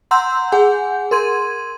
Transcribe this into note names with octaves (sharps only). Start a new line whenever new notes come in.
F#5 A#5 C6 E6 G6
G#4 F#5 G#5 G6
A#4 C6 G#6 D#7